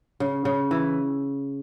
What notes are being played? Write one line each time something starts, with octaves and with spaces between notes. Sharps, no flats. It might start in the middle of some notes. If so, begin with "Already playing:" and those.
C#3
C#3
E3